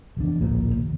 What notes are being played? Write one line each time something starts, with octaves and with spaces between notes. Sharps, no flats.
F1 E2 D4
D1 A#1 F3 A#3
F1 D#2